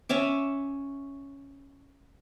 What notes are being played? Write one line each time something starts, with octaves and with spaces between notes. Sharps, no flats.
C#4 C#5 E5 D6